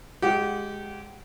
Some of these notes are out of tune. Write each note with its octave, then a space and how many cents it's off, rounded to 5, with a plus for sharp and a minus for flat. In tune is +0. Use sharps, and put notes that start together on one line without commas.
G#3 +0 G4 -25 F#5 -20